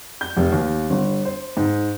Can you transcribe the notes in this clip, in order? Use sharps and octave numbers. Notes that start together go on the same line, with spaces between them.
G6
F1
D#2
G1
C5
G#2